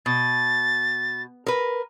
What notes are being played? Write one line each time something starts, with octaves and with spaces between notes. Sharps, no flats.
B2 A6
A#4 B4